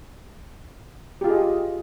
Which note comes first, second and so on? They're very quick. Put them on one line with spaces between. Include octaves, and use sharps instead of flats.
G4 F4 G#4 D#5